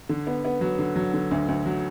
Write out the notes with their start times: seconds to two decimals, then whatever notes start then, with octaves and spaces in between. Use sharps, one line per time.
0.09 D3
0.27 B3
0.45 B3
0.61 F#3
0.79 D3
0.96 F#3
1.14 D3
1.31 D2
1.48 D2
1.66 F#3